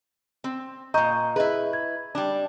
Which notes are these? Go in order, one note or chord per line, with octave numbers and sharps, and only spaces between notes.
C4
A#2 D#5 A#5 C#6 G6
E4 G#4 B4 D#5
G#6
G3 D4